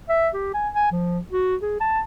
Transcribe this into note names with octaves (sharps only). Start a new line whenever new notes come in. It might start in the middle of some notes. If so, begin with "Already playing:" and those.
E5
G4
G#5
G#5
F3
F#4
G#4
A5